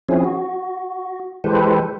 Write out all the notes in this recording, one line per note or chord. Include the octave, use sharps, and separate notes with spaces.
F3 C4 C#4 E4 G#4
F#4
E3 G#3 G4 A4 B4 C5